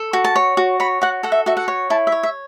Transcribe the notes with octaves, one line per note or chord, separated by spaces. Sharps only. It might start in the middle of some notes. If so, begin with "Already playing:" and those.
Already playing: A4
F#4
A5
C#5
F#4
C#5 B5
F#4 F#5
A4 F#5
E5
F#4 E5
F#5
C#5
E4 A5
E5
C#5
E5